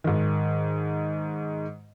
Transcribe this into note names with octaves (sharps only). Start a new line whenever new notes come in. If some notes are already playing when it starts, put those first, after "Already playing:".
G#2 D#3